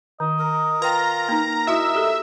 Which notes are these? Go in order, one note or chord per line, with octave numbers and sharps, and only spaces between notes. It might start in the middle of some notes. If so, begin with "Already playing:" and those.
D#3 D#5
A#4
F4 B4 G5 A#5
A#3 D#4
E4 F#4 D#5 E5
G4 A4